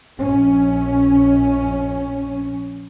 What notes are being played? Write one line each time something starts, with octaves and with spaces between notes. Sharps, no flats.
A#1 C#4